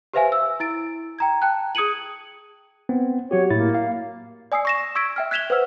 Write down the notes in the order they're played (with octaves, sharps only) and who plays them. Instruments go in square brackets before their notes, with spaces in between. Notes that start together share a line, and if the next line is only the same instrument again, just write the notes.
[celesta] G4 B4 C5 E5 F5 G#5
E6
E4 A6 D7
G5 A#5 G#6
G5 A5 F#6
G#4 D#6 G#6 C#7 D#7 F#7
[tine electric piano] B3 C4
[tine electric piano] F#3 F#4 G4 [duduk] C#5
[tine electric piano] A2 E4 A6 [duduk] A#3
[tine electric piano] F5
[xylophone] D5 G#5 D#6 E6 C7
C#6 A#6 E7
C#6 E6 G#6 B6 D7
E5 G5 F6
F#6 G#6 B6 E7 F7 G7
B4 C5 F#5 E6 F6